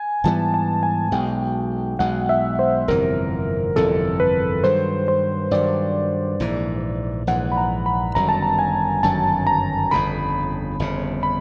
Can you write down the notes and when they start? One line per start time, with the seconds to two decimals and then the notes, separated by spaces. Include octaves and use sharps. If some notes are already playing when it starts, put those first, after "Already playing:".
Already playing: G#5
0.24 G#2 E3 G3 B3 A5
0.54 A5
0.83 G#5
1.12 B1 B2 G#3 G5
1.99 B1 B2 G#3 F#5
2.29 E5
2.59 C5
2.88 G1 F2 C3 E3 A#4
3.76 G1 F2 C3 E3 A4
4.20 B4
4.64 G2 D#3 F#3 C5
5.08 C5
5.51 G2 D#3 F#3 D5
6.40 A#1 G#2 E3
7.27 A#1 G#2 E3 F#5
7.52 B5
7.57 A#5
7.86 B5
8.15 G1 F#2 D#3 F#3 A#5
8.29 A5
8.42 A#5
8.59 G#5
9.03 G1 F#2 D#3 F#3 A5
9.47 A#5
9.91 G1 F2 C#3 B5
10.80 G1 F2 C#3
11.23 B5